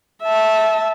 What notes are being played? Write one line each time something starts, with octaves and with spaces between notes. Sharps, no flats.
E5 A5